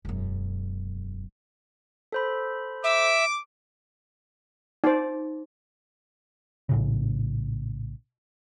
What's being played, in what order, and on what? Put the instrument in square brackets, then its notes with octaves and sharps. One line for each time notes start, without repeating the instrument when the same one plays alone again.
[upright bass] E1 F#2
[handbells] A4 C5 B5
[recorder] E5 [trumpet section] D6
[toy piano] D#4 [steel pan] C5 D5
[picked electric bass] A#1 A2 C#3